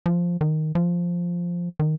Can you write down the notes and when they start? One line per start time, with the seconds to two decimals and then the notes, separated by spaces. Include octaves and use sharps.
0.06 F3
0.41 D#3
0.75 F3
1.79 D#3